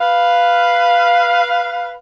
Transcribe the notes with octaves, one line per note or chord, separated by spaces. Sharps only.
B4 F5